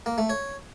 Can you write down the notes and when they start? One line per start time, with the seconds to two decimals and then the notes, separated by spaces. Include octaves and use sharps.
0.06 A#3
0.18 A3
0.30 C#5